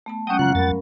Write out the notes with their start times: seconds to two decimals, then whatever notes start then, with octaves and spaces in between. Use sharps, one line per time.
0.06 A3 B3 A5
0.27 F#3 G#3 C#4 F#5 G5 D#6
0.39 F#2 C#3 F3 F4 F#6
0.55 F2 A#4 B5 A6